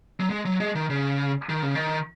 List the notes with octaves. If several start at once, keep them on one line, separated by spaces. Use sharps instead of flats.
F#3
G#3
F#3
G#3
D#3
C#3
D#3
C#3
D#3